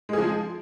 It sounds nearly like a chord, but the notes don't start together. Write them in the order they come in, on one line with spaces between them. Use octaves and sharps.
G#3 G#4 F3